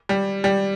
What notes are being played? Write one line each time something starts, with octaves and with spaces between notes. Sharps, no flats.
G3
G3